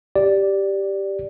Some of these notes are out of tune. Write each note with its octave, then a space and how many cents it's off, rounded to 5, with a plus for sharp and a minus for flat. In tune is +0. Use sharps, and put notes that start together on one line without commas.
G4 +0 D5 +0